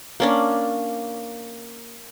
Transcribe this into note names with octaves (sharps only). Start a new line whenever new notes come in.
A#3 C#4 D4